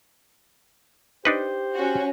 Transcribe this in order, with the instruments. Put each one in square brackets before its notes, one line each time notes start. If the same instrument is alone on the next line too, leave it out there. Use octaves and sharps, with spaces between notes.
[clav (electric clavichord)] D4 D#4 B4 [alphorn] G4 [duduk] C5
[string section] C#4 F#4